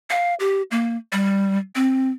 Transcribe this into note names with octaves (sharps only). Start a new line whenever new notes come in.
F5
G4
A#3
G3
C4